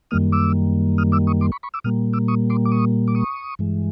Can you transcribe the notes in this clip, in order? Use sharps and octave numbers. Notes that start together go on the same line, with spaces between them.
F#2 D#3 G3 A#3 D#6 F6
D6 E6
D#6 F6
D6 E6
C#6 D#6
C6 D6
B5 C#6
B5 C#6
D6 E6
A#2 G3 A#3 D#6 F6
D6 E6
C#6 D#6
C6 D6
D6
C#6 D#6
D6
C#6 D#6
G2 E3 G#3